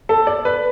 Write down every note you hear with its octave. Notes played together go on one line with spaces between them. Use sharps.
A4
D5
B4